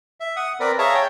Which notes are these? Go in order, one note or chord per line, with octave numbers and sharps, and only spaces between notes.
E5
F#5 D#6
C4 A#4 B4 D5 B5
G#4 C#5 E5 F5 A5 A#5
C#5 G5